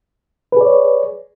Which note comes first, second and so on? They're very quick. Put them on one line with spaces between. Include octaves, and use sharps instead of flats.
B4 G#4 D5 C#5